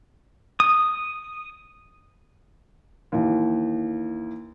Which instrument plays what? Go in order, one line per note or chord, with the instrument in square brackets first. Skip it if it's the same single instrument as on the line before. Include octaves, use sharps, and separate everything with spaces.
[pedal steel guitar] D#6
[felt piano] D#2 E3